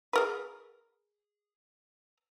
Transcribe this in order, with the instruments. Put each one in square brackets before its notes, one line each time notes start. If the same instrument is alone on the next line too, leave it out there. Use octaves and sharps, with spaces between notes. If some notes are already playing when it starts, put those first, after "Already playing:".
[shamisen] G#4 A#4 B4